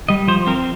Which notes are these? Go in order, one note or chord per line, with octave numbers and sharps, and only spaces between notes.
G3 D#5
F3 C5
C4 A#4